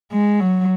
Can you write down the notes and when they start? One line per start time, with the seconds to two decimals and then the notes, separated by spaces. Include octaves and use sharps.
0.11 G#3
0.40 F#3